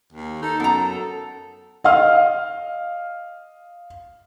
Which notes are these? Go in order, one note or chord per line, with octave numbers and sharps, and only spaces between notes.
D#2
D#4 A4
F#2 B3 A#5
D#5 F5 F6